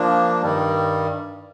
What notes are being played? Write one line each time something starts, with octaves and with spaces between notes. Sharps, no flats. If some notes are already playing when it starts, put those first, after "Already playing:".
Already playing: F3 A#3 D4
G2 D#3 G3